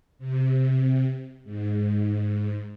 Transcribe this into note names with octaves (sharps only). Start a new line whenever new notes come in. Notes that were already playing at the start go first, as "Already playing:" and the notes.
C3
G#2